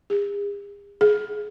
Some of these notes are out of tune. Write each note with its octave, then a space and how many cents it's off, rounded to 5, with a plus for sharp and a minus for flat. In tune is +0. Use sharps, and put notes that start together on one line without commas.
G#4 -45
G#4 +20